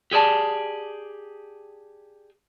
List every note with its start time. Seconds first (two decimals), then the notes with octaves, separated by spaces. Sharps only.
0.11 G4 G#4 D5 A5